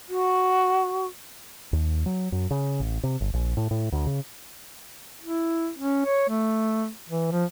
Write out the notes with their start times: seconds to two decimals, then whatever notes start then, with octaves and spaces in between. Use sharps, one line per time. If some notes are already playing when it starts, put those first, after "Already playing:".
0.09 F#4
1.73 D#2
2.06 F#3
2.32 F#2
2.51 C#3
2.80 A1
3.03 C3
3.21 G1
3.33 A#1
3.57 A2
3.71 A2
3.92 D2
4.06 C#3
5.22 E4
5.79 C#4
6.05 C#5
6.29 A3
7.09 E3
7.31 F3